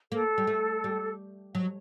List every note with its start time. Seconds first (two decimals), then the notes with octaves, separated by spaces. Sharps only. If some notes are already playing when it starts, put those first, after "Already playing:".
0.12 A#3 A4
0.38 G3
0.47 A3
0.84 G3
1.55 F#3